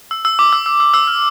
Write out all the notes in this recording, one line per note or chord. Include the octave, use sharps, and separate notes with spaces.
E6
E6
D6
E6
E6
E6
E6
F6